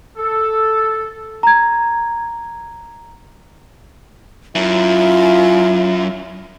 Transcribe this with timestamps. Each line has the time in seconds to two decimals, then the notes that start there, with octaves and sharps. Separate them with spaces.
0.17 A4
1.43 A#5 G#6
4.55 F#2 E4 F4